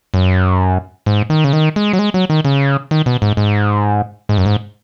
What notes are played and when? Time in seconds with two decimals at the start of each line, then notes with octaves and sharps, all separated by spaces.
0.14 F#2
1.06 G#2
1.30 D#3
1.44 C#3
1.53 D#3
1.76 G#3
1.93 F#3
1.99 G#3
2.14 F#3
2.30 D#3
2.45 C#3
2.91 D#3
3.06 B2
3.22 G#2
3.37 G#2
4.29 G#2
4.38 F#2
4.46 G#2